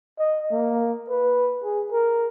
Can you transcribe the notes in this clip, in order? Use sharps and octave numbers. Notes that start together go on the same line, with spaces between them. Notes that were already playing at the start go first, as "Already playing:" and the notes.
D#5
A#3
B4
G#4
A#4